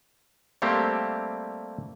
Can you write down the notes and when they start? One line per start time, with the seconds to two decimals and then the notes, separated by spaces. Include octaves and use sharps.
0.62 G3 A3 A#3 C4 G4